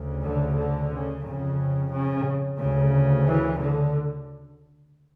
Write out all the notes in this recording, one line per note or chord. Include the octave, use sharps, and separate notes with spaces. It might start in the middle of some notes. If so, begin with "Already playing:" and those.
Already playing: D2 C#3
D3
D3
C#3
F2 C#3
C#3
D2 C#3
E3
D3